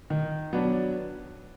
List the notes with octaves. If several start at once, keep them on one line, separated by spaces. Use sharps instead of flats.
D#3
F#3 B3 D4